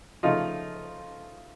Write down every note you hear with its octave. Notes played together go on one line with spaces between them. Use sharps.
C#3 F3 A3 D#4 F4